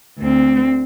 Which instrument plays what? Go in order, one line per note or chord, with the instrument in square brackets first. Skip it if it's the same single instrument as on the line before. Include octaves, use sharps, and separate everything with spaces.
[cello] D2 C4